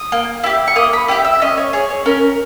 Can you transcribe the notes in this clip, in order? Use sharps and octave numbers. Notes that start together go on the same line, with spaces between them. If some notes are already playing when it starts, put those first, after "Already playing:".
Already playing: D#6
A#3
E4 G4
C#6
A#3 D#6
B5
E4 G4 G5
E5
C#4 D#5
C#5
G#4 C#5
C#5
C#4 A#4